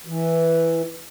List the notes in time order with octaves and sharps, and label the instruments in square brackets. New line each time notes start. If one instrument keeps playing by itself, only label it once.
[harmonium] E3